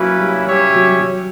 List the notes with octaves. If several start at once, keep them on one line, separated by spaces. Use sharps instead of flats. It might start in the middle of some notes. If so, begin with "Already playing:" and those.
Already playing: F#3 A#3 C#4 E4 B4
G3
G3 C#4 G4 C#5 E5
F#3
G3
F#3